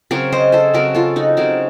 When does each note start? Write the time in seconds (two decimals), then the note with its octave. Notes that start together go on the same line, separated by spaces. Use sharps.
0.11 C#3 F#3 C4 A#4 C#5
0.32 C5 D#5
0.52 A4 C5
0.74 C#3 F#3 C4 F#4 A#4
0.94 F4 A4
1.16 D#4 F#4
1.37 C#3 F#3 C4 F#4 A#4